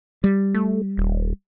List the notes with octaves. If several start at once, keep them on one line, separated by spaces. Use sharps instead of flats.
G3
A3
D#1